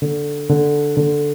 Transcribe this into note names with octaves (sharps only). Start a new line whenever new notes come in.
D3
D3
D3